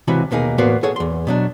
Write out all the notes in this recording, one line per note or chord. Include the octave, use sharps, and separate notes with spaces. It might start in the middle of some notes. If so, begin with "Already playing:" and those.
C#2 C3 E3 F#4 B5
D#2 B2 A#3 D#4 G#4
E2 A2 A#3 B3 F#4 C5
G#4 A4 C#5 F#5
E2 C6
B2 F#3 D4